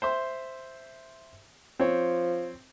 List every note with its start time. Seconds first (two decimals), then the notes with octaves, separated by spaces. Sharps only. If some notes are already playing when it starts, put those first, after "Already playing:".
0.02 C5 E5 C6
1.80 F3 C4 C#5